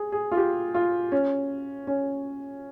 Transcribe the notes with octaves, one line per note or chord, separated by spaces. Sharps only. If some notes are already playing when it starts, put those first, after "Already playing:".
Already playing: G#4
G#4
F4
G4
F4
C#4
C#4